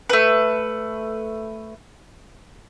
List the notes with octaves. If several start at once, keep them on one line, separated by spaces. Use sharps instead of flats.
A3 B4